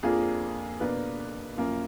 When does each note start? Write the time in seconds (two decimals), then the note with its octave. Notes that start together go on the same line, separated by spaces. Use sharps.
0.03 F2 F3 A#3 D4 G#4
0.80 B2 A#3 D4 B4
1.57 F#2 F3 A#3